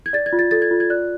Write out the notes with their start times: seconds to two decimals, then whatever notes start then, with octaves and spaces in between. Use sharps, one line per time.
0.06 G#6
0.13 D5 A6
0.26 G#6
0.33 F4
0.39 A6
0.51 A4 A6
0.62 G#6
0.71 F4
0.80 G#6
0.90 D5 F#6